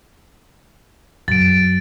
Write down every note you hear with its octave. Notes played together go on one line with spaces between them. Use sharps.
F#2 A6 D7